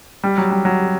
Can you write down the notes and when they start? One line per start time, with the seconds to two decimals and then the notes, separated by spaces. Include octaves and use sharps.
0.23 G3
0.38 F#3
0.51 G3
0.65 F#3